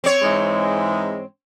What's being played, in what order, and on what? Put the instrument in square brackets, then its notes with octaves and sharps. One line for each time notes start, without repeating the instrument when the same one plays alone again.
[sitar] C4 C#5
[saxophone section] G#2 E3 G#3